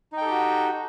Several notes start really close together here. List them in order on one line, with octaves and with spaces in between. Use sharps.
D#4 G5 A4 G4 F#4